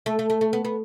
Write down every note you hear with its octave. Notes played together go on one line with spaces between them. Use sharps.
A3
A3
A3
A3
B3
B3